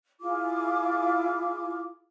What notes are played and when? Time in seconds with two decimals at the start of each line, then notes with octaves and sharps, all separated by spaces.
0.20 E4 F4 G#4 D6